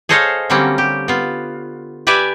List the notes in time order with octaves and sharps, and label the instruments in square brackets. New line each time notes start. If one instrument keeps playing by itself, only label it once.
[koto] G#4 A4 C5 C#5 D#5 F5
D3 F#3 G3 A#3 C4 C#4
G4
B3 F4
G4 B4 D5 E5 G#5